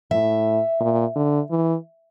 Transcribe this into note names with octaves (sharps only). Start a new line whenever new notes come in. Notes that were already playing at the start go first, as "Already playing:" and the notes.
A2 E5
A#2
D3
E3